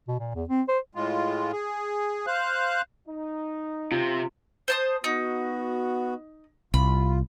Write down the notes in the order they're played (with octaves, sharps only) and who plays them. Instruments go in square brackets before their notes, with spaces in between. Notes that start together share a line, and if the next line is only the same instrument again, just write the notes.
[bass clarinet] B2
A#2
E2
C4
C5
[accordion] A2 G#3 F4
G#4
C5 F5 F#6
[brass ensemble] D#4
[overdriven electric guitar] C3 [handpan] F4
[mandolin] C5 A5 D#6
[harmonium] B3 F#4 [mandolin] D#4
[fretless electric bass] C2 [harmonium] F4 [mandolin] B5